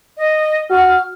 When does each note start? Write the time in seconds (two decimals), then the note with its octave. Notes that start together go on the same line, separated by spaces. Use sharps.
0.17 D#5
0.70 F#4 F6